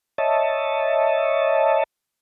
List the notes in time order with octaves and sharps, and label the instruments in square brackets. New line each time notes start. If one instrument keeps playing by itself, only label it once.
[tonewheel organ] C#5 D#5 E5 A5